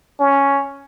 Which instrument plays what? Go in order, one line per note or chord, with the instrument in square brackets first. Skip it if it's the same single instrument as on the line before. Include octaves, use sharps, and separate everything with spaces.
[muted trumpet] C#4